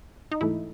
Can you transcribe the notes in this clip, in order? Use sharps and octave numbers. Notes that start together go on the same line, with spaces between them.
D#4
G#2 E3 A3 E4